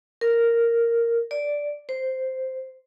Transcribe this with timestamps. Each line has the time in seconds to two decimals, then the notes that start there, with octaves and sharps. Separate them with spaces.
0.21 A#4
1.31 D5
1.89 C5